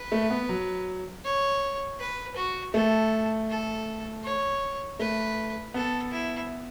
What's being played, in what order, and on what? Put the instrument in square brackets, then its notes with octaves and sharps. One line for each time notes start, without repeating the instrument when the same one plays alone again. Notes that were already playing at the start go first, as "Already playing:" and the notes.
Already playing: [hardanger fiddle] B4
[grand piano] A3
B3
F#3
[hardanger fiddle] C#5
B4
F#4
[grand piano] A3 [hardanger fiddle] A4
[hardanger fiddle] A4
C#5
[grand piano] A3 [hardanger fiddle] B4
[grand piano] B3 [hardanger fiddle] A4
[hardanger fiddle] E4